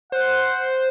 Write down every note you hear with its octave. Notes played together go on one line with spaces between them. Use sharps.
C5 F#5